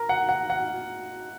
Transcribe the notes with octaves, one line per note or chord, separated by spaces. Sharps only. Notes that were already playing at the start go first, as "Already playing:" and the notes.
Already playing: A#4
F#5
F#5
F#5